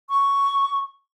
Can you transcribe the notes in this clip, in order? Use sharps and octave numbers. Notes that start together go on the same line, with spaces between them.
C#6